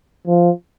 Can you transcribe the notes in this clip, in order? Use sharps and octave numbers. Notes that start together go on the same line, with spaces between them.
F3